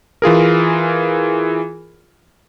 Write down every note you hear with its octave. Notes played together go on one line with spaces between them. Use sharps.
E3 F4 G#4 A#4